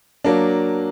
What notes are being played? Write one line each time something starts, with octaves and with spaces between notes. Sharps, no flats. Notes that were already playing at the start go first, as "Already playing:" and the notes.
F#3 A#3 D4